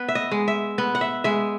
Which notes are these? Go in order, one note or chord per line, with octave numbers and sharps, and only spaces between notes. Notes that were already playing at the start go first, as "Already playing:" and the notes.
Already playing: B3 B4
E5
D#5
G#3
E5
B3
F#5
E5
G#3 E5